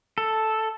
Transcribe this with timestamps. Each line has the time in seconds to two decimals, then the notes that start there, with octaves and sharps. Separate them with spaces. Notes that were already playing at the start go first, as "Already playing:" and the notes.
0.18 A4